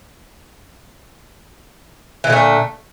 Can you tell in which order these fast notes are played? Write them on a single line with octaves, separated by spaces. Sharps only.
E3 A#2 D3 A3